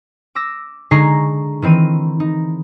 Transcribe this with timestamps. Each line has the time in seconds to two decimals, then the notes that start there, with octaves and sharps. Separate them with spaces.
0.35 D6 E6 A#6 E7
0.91 D3 G#3 D#4 A#5 C#6 C7
1.62 D#3 E3 C4 D#4 D#7
2.20 D#4